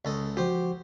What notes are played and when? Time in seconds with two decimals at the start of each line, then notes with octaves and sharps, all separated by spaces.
0.05 C#2 A4 D#5
0.37 F3 F#4 G4 C5